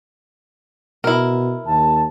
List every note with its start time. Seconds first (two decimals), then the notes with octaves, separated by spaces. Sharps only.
1.04 B2 E4 A#4
1.66 D#2 A5